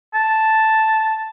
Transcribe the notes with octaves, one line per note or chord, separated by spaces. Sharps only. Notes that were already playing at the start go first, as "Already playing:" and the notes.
A5